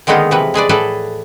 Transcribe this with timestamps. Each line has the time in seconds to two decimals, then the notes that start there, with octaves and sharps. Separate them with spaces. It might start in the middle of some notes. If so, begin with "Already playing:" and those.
0.07 D3 D#3 G#3 A#3 B3 D#4
0.31 C3 E3 F3 B4
0.54 G#3 G#4 B4 D5
0.69 A2 G#4 A4 B4 D5